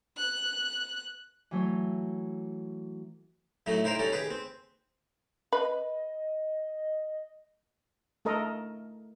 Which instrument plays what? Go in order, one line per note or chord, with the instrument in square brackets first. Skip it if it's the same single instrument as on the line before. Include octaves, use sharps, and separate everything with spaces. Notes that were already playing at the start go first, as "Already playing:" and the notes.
[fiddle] F#6
[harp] E3 F#3 A3 C#5
[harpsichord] F#2 A2 F#3 A3 D#4
D#4 E4 A#4 C5 G5 A#5
G3 C#4 D#4 A4
D#3 G4 G#4 B4
C4
[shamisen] B4 [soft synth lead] D#5
[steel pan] A3 A4 A#4 D#5